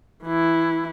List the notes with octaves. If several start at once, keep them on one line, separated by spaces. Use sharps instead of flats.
E3 E4